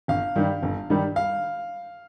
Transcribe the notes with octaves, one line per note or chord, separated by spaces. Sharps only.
G1 F5
G2 D#3 G3
G1
G2 D#3 G3
F5